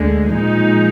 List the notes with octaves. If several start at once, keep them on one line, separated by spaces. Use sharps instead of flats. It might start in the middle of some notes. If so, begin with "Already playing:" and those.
Already playing: D2 D3 G#3
A#2 F3 G#3 D#4